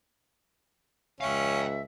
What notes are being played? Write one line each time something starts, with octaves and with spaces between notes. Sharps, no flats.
C#2 C#4 E5 F5 G5